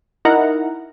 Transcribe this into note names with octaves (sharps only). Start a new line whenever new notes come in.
D#4 E4 A#4 F#5 A#5